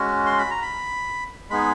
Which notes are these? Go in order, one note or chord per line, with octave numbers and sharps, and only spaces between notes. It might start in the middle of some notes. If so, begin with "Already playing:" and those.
Already playing: G#3 C#4 F#4
C6
B5
A#5
B5
G#3 B3 D#4 G#4 B5